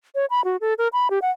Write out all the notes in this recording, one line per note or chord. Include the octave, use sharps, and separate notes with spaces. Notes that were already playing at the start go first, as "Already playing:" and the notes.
C#5
B5
F#4
A4
A#4
B5
G4
F#5